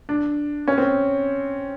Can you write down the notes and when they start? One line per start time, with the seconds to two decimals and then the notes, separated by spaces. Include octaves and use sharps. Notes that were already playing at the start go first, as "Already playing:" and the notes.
0.09 D4
0.68 C#4
0.78 C4